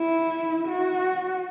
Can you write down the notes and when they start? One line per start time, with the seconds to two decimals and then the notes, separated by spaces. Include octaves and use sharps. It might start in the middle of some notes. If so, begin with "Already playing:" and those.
Already playing: E4
0.68 F#4